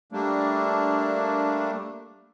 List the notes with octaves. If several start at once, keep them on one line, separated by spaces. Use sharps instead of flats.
G3 A3 A#3 D4